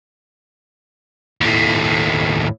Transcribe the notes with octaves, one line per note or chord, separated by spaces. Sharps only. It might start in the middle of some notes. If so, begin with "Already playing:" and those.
D#2 A2